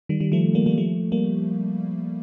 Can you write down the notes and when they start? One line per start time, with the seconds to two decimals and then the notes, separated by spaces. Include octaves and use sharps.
0.09 D#3 G3
0.20 D#3 G3
0.32 F3 A3
0.55 G3 A#3
0.66 G3 A#3
0.78 F3 A3
1.12 G3 A#3